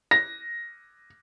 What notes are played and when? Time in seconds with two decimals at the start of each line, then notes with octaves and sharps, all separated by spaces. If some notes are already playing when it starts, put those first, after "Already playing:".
0.11 A#6